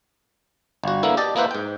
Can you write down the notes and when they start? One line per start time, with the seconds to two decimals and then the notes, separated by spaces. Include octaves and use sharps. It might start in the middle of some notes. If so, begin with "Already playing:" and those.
0.84 G1 F#4
1.03 D3 A#3 B3 E4
1.17 G4 D5 D#5 A5
1.36 A#3 B3 E4 B4 C5
1.51 G#2 G5